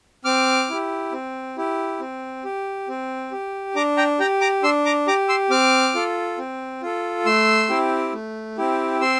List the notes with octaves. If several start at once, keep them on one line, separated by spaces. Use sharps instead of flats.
C4 D6 F6
E4 G4
C4
E4 G4
C4
G4
C4
G4
D4 A#5 D6
G5 A#5
G4 G5 A#5
A#5 D6
D4 C6 E6
A#5 D6
G4 A#5 D6
C6 E6
C4 D6 F6
F4 A4
C4
F4 A4
A3 C6 E6
C4 E4 G4
A3
C4 E4 G4
C4 C6 E6